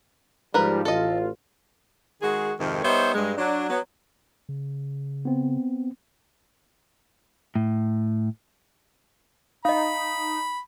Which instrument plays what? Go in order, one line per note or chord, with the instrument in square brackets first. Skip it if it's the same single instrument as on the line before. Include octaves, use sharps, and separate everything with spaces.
[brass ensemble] G#2 F3 G3 [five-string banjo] A#4 B4
[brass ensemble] A1 F4 [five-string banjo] A4 D#5
[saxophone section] D#3 G#3 F#4 G#4
F2 G#2 C3 D#3
G3 B3 D#4 C5 C#5 E5
G2 G#3
F#3 D4
F#3 B3
[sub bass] C#3
[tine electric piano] B3 C4
[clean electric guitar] A2
[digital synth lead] D#4 [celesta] D#5 F5 [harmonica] B5